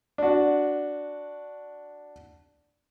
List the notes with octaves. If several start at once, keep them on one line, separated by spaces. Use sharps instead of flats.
D4 F#4